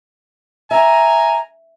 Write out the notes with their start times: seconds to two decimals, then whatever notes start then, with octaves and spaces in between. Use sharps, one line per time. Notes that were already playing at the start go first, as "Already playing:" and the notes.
0.71 E5 G#5 A#5